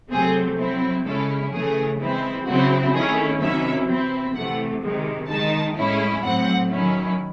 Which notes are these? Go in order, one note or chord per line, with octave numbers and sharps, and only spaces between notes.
C3 F#3 A3 C4 G#4
F#3 C4 E4
C#3 G#3 C#4 E4 A4
C#3 E3 A3 G#4
E3 G#3 C4 E4
C#3 F#3 C4 E4 F#4
D#3 A3 C#4 E4 G#4
C3 D#3 F#3 C#4 E4 E5
E3 C4 E4
C3 E3 A3 F#5
C3 D#3 G#3
D#3 G#3 D#4 A5
A2 G#3 C#4 E4
A2 F#3 C4 F#5
D#3 F#3 C#4 E4